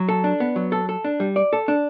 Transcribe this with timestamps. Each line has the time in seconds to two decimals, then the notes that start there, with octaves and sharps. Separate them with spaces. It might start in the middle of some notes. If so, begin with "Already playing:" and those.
Already playing: F#3
0.09 A4
0.24 D4
0.40 B3
0.56 F#3
0.72 A4
0.89 A4
1.04 D4
1.20 G3
1.36 D5
1.53 A4
1.68 D4